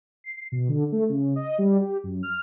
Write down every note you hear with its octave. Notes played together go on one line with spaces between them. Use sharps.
C7
B2
D3
A3
C#3
D#5
G3
G4
F#2
F6